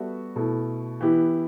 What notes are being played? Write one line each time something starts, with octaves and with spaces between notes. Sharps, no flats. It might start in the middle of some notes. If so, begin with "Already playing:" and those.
Already playing: G3 B3 F#4 A4 E5
B2 A3 E4
E3 B3 E4 G4